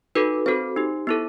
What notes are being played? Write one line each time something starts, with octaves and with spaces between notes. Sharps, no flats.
D#4 F#4 A4 B4
C4 F#4 A4 C5
D#4 G4
B3 E4 A4